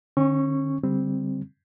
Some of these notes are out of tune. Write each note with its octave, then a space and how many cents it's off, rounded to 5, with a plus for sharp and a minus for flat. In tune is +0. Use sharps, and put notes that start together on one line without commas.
D3 +25 C#4 -35 C#6 +0
D3 -30 G3 +0 C4 +0